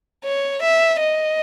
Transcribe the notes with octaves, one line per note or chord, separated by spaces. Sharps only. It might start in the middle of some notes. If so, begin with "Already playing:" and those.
C#5
E5
D#5